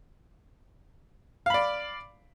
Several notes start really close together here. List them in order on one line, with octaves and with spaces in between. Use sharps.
F5 B5 D5